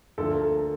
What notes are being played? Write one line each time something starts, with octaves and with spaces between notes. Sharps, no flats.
D2 D3 F3 A4
A#4
A4